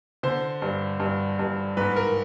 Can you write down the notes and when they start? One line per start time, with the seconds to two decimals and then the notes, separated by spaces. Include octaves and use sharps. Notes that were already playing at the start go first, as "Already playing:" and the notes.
0.23 D3 C5
0.62 G2
1.00 G2
1.39 G2
1.77 G#2 B4
1.96 A#4